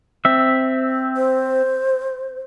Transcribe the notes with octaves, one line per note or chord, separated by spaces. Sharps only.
C4 E5
C5